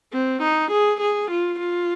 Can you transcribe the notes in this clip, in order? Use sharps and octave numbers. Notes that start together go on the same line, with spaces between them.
C4
D#4
G#4
G#4
F4
F4